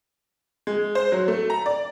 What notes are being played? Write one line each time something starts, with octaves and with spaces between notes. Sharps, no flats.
G#3
C5
F#3
A3
A#5
D5